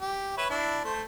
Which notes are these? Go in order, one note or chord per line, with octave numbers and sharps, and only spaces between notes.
G4
B4 C#5 E5
D4 E4
A3 C5